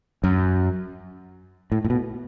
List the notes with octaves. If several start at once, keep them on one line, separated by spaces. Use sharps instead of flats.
F#2
A2
A2
B2